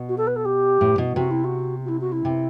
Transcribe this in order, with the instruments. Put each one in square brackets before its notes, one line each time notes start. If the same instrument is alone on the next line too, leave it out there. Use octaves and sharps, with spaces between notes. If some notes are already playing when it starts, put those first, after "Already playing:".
Already playing: [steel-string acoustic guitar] B2
[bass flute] F#4
A4
B4
A4
G4
[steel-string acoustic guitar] A2
B2
[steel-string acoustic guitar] C3 [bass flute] F#4
[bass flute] E4
F#4
F#4
E4
F#4
E4
[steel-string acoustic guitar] C3